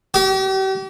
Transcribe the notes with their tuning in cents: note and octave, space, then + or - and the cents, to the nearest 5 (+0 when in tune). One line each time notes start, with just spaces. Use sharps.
G4 -40